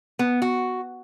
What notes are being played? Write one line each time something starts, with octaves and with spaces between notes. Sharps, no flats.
B3
F#4